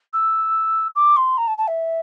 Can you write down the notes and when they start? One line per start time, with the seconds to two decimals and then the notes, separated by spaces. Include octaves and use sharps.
0.13 E6
0.95 D6
1.16 C6
1.37 A#5
1.47 A5
1.58 A5
1.67 E5